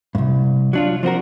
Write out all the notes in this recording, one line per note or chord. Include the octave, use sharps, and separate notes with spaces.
C2 G2
F#3 D4 F4
F3 C4 F#4 A#4